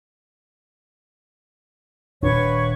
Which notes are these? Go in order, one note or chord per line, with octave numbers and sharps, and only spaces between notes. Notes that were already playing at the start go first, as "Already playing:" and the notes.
D#1 D4 B4 C#5 C#6